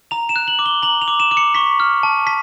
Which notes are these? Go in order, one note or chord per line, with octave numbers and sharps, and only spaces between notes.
A#5 F7
E7
F#6
F#7
D6
G7
A#5 F#7
F7
D6
E7
D6
C#7
C#6 B6
F6
A5
A5 B6